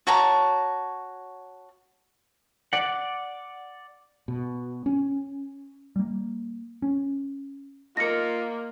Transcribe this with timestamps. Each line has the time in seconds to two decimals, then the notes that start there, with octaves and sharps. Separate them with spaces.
0.07 F#4 C#5 A5 A#5
2.73 D5 F#5
4.28 B2
4.86 C#4
5.96 G3 A#3
6.82 C#4
7.97 A#3 D#4 F4 A#4 A#6 C#7